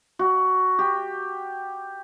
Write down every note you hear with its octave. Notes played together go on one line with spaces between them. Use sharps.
F#4
G4